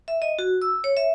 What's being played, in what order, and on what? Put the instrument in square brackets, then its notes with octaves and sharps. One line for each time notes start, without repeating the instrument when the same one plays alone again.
[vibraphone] E5
D#5
F#4
E6
C#5
E5